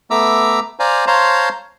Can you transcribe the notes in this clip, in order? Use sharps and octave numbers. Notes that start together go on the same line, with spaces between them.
A3 B3 E5 A#5 D6 E6
C5 D5 F5 G#5 A#5
C5 C#5 F5 A5 A#5 C6